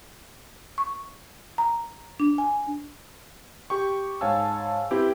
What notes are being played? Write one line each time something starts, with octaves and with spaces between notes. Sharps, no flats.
C#6
A#5
D4
G#5
G4 G5 C#6
G#2 C#5 F5 G#5 A5 E6
C4 E4 G4 B4